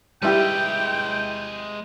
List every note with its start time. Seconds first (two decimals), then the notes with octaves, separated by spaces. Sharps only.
0.22 G3 G#3 E4 G4 B4 G5